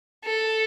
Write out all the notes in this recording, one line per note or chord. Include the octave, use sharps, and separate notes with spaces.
A4